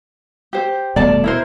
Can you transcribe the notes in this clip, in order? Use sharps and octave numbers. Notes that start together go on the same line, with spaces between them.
G4 C5
D#1 B2 A3 D5 A5
E4 A#4 C5